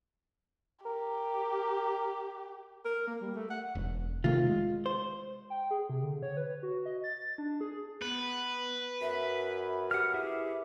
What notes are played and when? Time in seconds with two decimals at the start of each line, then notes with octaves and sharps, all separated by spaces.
0.85 G4 A#4
2.85 A#4
3.07 A#3
3.21 G3
3.35 A3
3.50 F#5
3.75 E1
4.24 C3 D#3 A3 F4
4.46 G#3
4.86 C5
5.50 G5
5.71 G#4
5.90 C3
6.02 D3
6.23 C#5
6.37 B4
6.63 F#4
6.86 D#5
7.04 A6
7.38 D4
7.61 G#4
8.02 B3 B4
9.01 F#2 E5
9.91 G4 F#5 F6
10.14 E4 G#4 E5